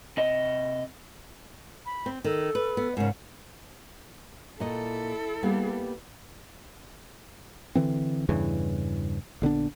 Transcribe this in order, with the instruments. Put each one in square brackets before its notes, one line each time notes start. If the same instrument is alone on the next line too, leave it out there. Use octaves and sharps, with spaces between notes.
[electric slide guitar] C3 D#5
[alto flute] B5
[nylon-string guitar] C4
[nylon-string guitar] D#3 [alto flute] A4
[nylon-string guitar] B4
B3
[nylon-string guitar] G#2 C#3 [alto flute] A#4
[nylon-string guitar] A#2 D#5 [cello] E4 A4
[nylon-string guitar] G3 A#3 B3
[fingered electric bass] D3 E3 C4
E2 G2 C#3 E3
A#1 D3 B3 D4